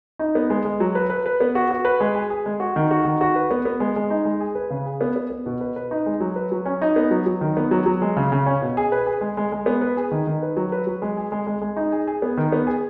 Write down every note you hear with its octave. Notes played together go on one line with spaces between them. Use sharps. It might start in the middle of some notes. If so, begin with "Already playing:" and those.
D#4
B3
G#3
G#3
F#3
B4
B4
B4
B3
F#4
F#4
B4
G#3
G#4
G#4
G#3
F#4
D#3
F#4
D#3
F#4
B4
B3
B3
G#3
G#3
D#4
G#3
G#4
B4
C#3
G#4
B3
B3
B3
B2
B4
B4
D#4
G#3
F#3
B4
F#3
C#4
D#4
B3
F#3
F#3
D#3
B3
F#3
F#3
G#3
C#3
C#3
C#4
B2
G#4
B4
G#4
G#3
G#3
G#3
B3
B4
G#4
D#3
D#3
B4
F#3
B4
F#3
G#3
G#4
G#3
G#3
G#3
D#4
G#4
G#4
B3
D#3
B3
G#4